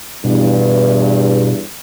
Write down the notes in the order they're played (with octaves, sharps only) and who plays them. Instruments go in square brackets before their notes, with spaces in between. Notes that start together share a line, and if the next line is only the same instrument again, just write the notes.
[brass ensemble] E2 G2 [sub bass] B2